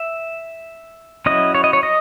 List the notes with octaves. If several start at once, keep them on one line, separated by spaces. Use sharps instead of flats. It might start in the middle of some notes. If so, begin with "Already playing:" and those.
Already playing: E5
F#3 C#4 E4 D#5
C#5
D#5
C#5
D#5